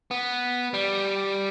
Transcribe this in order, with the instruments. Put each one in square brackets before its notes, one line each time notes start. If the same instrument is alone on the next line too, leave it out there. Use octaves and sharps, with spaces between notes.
[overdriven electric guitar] B3
G3